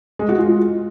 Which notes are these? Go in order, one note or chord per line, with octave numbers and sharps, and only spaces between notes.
G#3
F#4
F4